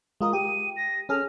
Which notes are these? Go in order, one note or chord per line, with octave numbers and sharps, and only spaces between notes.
G#3 F4 A#4 D#6
G4 D#7
A#6
C#4 G#4 A4 F6